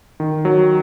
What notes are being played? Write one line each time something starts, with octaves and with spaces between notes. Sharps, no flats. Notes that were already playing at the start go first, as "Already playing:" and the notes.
D#3
F#3